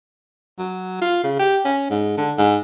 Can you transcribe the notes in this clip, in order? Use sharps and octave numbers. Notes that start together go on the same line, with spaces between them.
F#3
F4
C#3
G4
C#4
G#2
D3
G#2